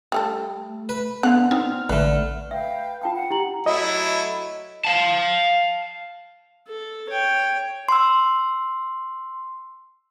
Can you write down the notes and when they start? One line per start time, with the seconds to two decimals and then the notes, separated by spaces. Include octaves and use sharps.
0.12 G3 A3 G#4 A4
0.89 B4
1.23 D3 B3 F5 F#6
1.51 C4 D#4 F6
1.89 A1 D3 A3 B4
2.51 B4 E5 F5 G5
3.02 F4 F5 G5 A5 B5
3.14 F#5
3.30 E4 G4 A#5 F#7
3.66 F#3 A3 E4 D#5
4.85 F5 A5
6.68 A4
7.09 C#5 G5
7.89 C6 E6